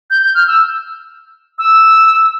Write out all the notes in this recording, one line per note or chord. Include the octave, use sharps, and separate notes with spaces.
G6
G6
F6
E6
E6